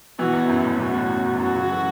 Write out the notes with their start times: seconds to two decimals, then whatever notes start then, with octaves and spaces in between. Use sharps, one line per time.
0.19 B2 E3 F#4
0.33 E2
0.49 F#2 E4
0.64 E2 A2
0.79 F#2 B2 F#4
0.94 E2 A2
1.10 F#2
1.25 F#2
1.34 E2
1.39 F#2 F#4
1.55 C#3 F#3
1.70 E3 A3